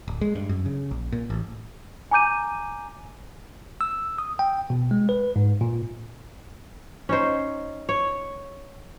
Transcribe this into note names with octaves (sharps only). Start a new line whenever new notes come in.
D1
G#3
G2
F#2
C#3
A#1
A#2
A1
G#5 A#5 D6 G6 D#7
E6
D#6
G5
B2
G#3
B4
G#2
A#2
C#4 D#4 C5
C#5